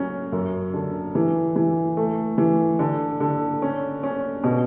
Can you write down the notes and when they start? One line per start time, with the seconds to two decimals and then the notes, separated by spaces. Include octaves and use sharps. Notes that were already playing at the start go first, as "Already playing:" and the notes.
Already playing: F#3 C#4
0.32 F#2
0.74 D3
1.15 E3
1.56 E3
1.97 A3
2.38 E3
2.79 D3
3.20 D3
3.62 C#4
4.03 C#4
4.44 B2